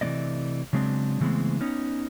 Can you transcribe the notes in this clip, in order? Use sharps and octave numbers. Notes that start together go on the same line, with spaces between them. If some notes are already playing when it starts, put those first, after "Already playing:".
C3 E3 A3 A#3 D5 D#5
C#3 F#3 G#3 C4 D4
C#3 E3 G#3 A3 B3 C4
B3 C#4 D#4